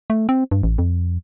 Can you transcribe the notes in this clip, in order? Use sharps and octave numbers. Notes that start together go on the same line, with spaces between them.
A3
C4
G2
A1
F2